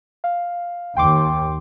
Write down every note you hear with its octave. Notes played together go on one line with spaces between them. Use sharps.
F5
D#2 G5 C6 D6